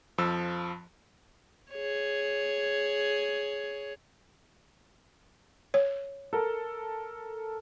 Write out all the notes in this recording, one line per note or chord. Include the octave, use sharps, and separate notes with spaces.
F2 F3 E6
G#4 C#5
C#5
A4 A#4